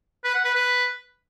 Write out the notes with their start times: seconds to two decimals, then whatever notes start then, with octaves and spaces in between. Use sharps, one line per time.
0.24 B4
0.34 F#5
0.44 B4
0.55 B4